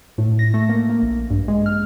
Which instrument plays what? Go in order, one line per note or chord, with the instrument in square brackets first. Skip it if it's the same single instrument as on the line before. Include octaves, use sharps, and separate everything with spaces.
[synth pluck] A2
A#6
A3
A#3
A#3
A#1
G2
G#3
F6